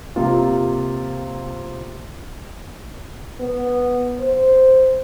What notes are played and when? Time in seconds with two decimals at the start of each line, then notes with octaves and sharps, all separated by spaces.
0.16 C3 A#3 F4
3.40 B3
4.20 C5